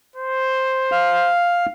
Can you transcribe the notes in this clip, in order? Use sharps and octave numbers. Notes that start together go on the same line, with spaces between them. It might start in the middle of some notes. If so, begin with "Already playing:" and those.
C5
F5